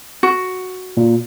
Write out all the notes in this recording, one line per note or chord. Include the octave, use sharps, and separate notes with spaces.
F#4
A#2